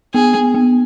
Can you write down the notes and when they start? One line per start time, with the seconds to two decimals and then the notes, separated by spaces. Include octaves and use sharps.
0.14 B3 G#4
0.34 B3
0.54 B3